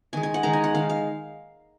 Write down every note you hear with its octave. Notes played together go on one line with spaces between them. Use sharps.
D#3 G#3 G#5
G#5
F#5
D#3 G#3 A#5
G#5
F#5
D#3 G#3 F5
F5